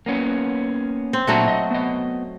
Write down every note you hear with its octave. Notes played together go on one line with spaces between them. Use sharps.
A#3 B3 C#4
C4
A#2 F#3 A3 D4 F#4 A#5
D#5
B3 D#5